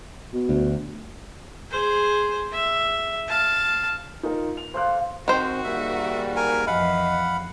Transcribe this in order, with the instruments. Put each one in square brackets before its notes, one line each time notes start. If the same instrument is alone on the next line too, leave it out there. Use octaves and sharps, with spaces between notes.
[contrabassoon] B2
[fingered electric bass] D2
[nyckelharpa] G#4 C5
E5
F5 A5
[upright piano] D#4 F4 A#4
F7
[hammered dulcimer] F4 A4 D5 [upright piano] C5 C6 F#6
[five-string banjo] D#3 C5 [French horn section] C4 [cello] F#4
[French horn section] G#2 G3 A#3 [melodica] E5
[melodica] A#4 G#5
[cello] F2 E3 [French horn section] D#5 [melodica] F5 F#5 B5